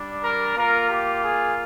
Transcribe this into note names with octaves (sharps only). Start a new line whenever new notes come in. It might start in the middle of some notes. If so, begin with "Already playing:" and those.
Already playing: G3 D4
A#4
A#3 F4 A#4
G4
G#4